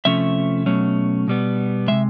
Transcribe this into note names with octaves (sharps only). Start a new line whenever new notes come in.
C3 F3 A3 C#4 E5
B2 F#3 A3 C#4
B2 G3 B3
C3 D#3 G#3 E5